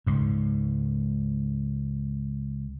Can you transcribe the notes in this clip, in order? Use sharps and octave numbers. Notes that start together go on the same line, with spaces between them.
C#2 G#2